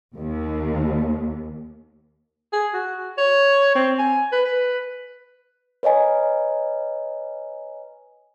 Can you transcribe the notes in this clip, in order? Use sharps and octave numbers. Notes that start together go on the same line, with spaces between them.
D#2
G#4
F#4
C#5
C4
G#5
B4
B4
B4 C#5 D#5 G#5 A#5